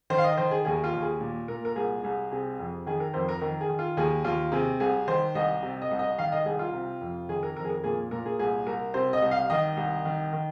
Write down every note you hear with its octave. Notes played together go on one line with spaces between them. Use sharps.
D#3 C5
F5
D#5
D#3 C5
G#4
D#2 G#4
F4
D#2
G#4
A#2
A#2 A#4
A#4
C2 G#4
C2 G#4
C3 G#4
F2
D#3 G#4
A#4
F2 C5
A#4
D#3 A#4
G#4
D#3
F4
D#2 G#4
D#2 F4
C3 G#4
C2 G#4
D#3 C5
C2 D#5
C3
D#5
C2
D#5
D#3 F5
D#5
C2 G#4
F4
C3
F2
D#3 G#4
A#4
F2 A#4
G#4
A#4
A#2 G#4
A#2 A#4
G#4
C2 G#4
C2 A#4
C3 C5
D#5
C2
F5
D#3 D#5
C2
D#3
D#3